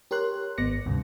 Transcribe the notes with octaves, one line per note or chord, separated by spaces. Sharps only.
G4 A#4 C#5 C6 F#6
G#1 B3 D6 A#6 C#7
D2 G2 C3